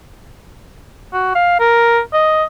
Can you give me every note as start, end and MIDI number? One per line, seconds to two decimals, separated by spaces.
1.13 1.32 66
1.35 1.56 77
1.60 2.00 70
2.13 2.44 75